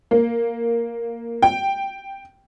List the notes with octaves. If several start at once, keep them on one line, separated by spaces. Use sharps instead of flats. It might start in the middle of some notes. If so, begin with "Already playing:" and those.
A#3
G5